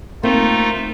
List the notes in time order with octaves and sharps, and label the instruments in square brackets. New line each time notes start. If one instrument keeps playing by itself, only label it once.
[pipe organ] A3 D#4 F4 [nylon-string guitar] A#3 C4